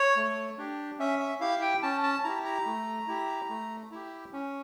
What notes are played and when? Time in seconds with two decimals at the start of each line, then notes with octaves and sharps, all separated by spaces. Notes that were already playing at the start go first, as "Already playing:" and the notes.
Already playing: C#5
0.16 A3
0.58 D4 G4
0.99 C#4 E5
1.20 E5
1.40 E4 G4 F5
1.62 G5
1.82 C#4 A5
2.03 A5
2.24 E4 G4 A#5
2.45 A#5
2.66 A3
3.07 E4 G4
3.49 A3
3.91 E4 G4
4.33 C#4